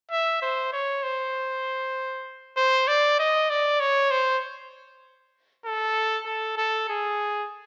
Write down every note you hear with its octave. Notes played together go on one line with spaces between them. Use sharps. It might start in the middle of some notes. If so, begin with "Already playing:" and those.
E5
C5
C#5
C5
C5
D5
D#5
D5
C#5
C5
A4
A4
A4
G#4